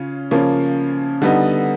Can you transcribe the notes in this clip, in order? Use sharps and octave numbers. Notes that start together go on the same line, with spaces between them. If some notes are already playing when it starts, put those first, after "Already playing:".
Already playing: C#3 C#4 F4
C#3 F3 A#3 C#4 F4
D3 G3 B3 D#4